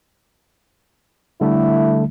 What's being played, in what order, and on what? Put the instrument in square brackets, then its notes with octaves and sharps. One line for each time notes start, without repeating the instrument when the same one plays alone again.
[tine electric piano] D3 G3 A3 [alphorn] E4